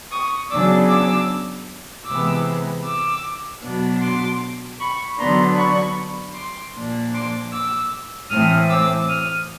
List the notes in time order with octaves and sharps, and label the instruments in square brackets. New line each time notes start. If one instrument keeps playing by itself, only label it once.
[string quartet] C#6 D#6
C#3 F#3 B3 D4 D6 E6
D6 E6
C3 E3 G#3 B3 D6 E6
D6 E6
B2 F#3 B3 D4
C6 D6
B5 C#6
D3 F#3 B3 D4 A#5 C6
B5 C#6
C6 D6
A#2 F3 A#3 D4
C6 D6
D6 E6
A2 E3 A3 C4 D#6 F6
D6 E6
D#6 F6